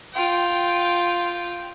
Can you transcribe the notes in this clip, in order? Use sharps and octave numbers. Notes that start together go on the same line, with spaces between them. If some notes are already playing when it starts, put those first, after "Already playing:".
F4 G5